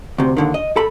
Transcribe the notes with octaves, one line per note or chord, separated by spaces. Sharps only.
D2 C3
D#2 D3 D#3
D#5
A4 B5